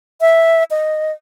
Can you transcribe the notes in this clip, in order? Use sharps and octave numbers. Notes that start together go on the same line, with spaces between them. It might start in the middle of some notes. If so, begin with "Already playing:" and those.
E5
D#5